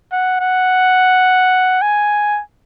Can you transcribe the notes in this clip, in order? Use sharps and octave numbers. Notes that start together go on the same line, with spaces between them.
F#5
F#5
G#5